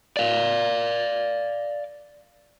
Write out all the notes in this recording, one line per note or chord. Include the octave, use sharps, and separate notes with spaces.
D5 F5